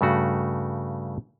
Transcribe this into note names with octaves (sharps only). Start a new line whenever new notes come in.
G2 C#3 A3 F#4